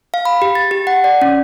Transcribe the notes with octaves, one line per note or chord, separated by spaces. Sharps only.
F5
B5
G4
A6
G4
F#5
D5
C#4